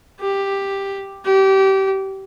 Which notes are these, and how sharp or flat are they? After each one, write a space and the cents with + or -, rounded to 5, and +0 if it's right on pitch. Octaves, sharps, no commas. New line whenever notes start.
G4 +5
G4 -25